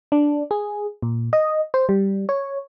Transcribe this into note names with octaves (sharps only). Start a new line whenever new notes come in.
D4
G#4
A#2
D#5
C5
G3
C#5